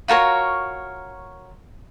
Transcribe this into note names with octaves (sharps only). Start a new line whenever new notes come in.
F4 F#4 A#4 C#5